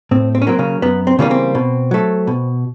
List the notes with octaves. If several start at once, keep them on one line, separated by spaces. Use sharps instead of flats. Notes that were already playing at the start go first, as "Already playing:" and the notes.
A2 C4
C4
C#4
F#3 A#3 C4
C#3 C#4
F#2 B3
C4
C#3 E3 G3 A#3 C#4
C4
B2
F#3 A3
B2